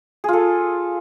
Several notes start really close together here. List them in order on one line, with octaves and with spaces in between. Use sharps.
G#4 F4 A4